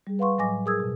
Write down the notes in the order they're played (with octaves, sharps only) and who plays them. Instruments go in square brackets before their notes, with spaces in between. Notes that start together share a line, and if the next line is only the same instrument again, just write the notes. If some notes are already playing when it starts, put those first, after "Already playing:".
[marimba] G3 G#4
B4 F5 F#5 C6 C#6
A2 F#3 D#5 G#5 D6 A#6
G#4 A#4 D#6 E6 G#6
F2 B2